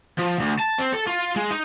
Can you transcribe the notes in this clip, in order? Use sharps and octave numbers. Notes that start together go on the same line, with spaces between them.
F3
D2
A5
C4
A4
F4
G#3
D#4